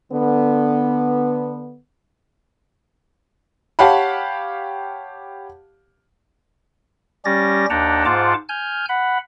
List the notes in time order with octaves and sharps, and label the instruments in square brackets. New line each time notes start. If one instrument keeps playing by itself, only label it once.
[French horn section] D3 B3
[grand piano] G4 C#5 F5 F#5 A5 B5
[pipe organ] G3 C#4 G4 A6 A#6
D#2 D4 F#5 G5 A5 A#5
G#2 F4 C5 F#5 A5 D6
G#5 F6 G6
F#5 B5